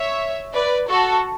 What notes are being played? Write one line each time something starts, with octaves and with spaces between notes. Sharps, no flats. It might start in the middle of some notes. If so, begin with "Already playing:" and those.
Already playing: C#5 E5
B4 D5
F#4 A4